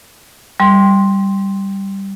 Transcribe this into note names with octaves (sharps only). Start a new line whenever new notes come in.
G3 C6